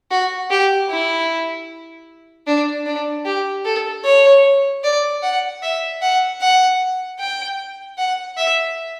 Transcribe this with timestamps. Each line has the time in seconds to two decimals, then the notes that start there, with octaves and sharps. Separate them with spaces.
0.11 F#4
0.50 G4
0.90 E4
2.47 D4
2.86 D4
3.25 G4
3.65 A4
4.04 C#5
4.83 D5
5.23 F#5
5.63 E5
6.02 F#5
6.41 F#5
7.19 G5
7.98 F#5
8.38 E5